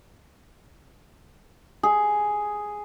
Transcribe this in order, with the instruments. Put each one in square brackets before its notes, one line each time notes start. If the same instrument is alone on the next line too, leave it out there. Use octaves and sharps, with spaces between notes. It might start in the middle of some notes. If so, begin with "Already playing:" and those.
[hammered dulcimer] G#4